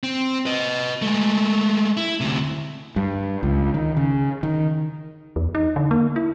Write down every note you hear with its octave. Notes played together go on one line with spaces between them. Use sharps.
C4
B4 D#5
G#3 A3
E4
D2 C3
G2
C#2
D#3
C#3
D#3
E2
D#4
D3
A#3
E4